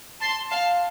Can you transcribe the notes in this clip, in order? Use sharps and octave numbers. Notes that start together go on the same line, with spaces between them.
A5 C6
F5 A5